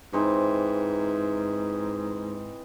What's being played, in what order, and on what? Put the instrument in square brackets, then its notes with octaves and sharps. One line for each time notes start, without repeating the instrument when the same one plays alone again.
[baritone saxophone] G#2 [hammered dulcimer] E3 C4 D#4